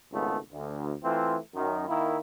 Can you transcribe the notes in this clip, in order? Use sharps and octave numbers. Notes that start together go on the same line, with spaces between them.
G#1 C#2 A3 B3
D2
E3 A3 C4 F4
F#2 D#3
D#3 A#3 E4